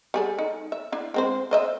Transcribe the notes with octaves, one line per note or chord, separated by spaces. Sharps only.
G3 G#4 A4
D#4
E5
D4 E4
G#3 C4 C5
C5 D#5 E5